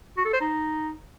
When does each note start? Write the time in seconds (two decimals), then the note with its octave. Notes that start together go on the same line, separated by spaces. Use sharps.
0.17 F#4
0.25 A4
0.33 C5
0.41 D#4